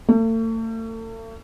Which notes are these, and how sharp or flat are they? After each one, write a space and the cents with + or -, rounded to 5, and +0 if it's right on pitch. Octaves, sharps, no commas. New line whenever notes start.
A3 +40